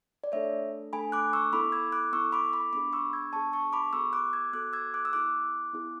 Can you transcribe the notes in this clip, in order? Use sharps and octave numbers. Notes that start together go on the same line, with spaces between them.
D5
A3 D4 A4 C#5 E5
A3 D4 A4 G#5 B5
D6 F#6
C#6 E6
B3 E4 A4 B5 D6
E6 G#6
D6 F#6
B3 E4 A4 C#6 E6
B5 D6
B5 D6
B3 D4 G#4 B5 D6
C#6 E6
E6 G#6
B3 D4 G#4 A5 C#6
A5 C#6
B5 D6
B3 F#4 A4 C#6 E6
D6 F#6
E6 G#6
B3 F#4 A4 D6 F#6
E6 G#6
D6 F#6
E6
B3 E4 G#4 D6 F#6
B3 E4 G#4